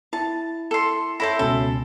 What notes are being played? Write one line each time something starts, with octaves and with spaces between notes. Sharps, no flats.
E4 A5
A4 C6
E4 A4 C5 C#5 B5 A#6
C#2 B2 C#4 A4